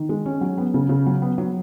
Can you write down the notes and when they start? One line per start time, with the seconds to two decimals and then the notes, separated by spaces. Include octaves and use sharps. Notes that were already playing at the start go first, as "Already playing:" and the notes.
Already playing: D#3
0.09 G#3
0.25 C#4
0.41 F#3
0.58 B3
0.74 C#3
0.89 C#3
1.06 F#3
1.22 B3
1.38 F#3